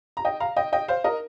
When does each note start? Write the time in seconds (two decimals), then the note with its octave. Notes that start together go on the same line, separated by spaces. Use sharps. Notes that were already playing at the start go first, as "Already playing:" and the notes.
0.17 A#5
0.25 D#5 G5
0.40 F5 A#5
0.56 D#5 G5
0.72 D#5 G5
0.88 C5 F5
1.04 A#4 D#5